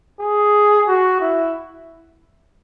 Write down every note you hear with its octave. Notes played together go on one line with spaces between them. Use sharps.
G#4
F#4
E4